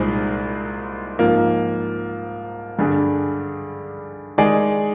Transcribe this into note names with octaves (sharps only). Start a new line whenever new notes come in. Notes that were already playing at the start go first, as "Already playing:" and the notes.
Already playing: C2 A#2 G#3 C4 D#4
G#2 F3 A#3
G2 D3 G3 D4 G#4
D#3 G#3 D#4 G#4 D5